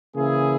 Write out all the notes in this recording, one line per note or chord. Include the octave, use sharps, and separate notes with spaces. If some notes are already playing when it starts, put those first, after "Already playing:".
C#3 E3 A#3 E4 G#4